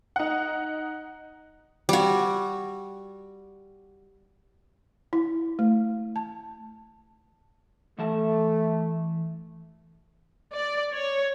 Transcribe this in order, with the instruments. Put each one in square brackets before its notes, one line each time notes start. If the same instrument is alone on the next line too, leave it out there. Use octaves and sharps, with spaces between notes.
[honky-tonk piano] D#4 F#5
[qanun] G3 F#4
[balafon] E4
A3
A5
[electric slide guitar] E3 E5 A5 [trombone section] A3
[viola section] D5
C#5